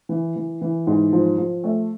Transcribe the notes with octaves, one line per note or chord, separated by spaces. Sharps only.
E3
E3
E3
G#2
F3
F3
A3